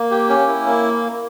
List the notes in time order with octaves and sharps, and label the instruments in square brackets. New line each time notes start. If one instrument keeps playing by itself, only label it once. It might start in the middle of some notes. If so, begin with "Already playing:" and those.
Already playing: [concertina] A#3
G4
C#4
E4
A#3